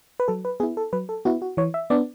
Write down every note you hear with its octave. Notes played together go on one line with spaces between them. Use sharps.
B4
F#3 A4
B4
B3 E4 G#4
A4
F#3 B4
A4
B3 E4 F#4
F#4
E3 C#5
E5
B3 D4 D5